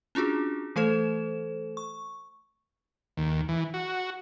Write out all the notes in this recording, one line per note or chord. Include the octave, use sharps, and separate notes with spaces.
C#4 D4 F4 F#4 G#4
E3 A3 A4 C5 E7
C#6
D#2
E3
F#4